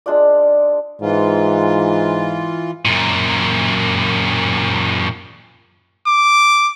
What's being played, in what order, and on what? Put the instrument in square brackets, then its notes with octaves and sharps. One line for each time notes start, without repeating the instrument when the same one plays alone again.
[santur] G#3 D4 F4 D5
[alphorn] G#2 [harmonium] E3 F4
[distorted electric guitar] F#2 A#2
[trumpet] D6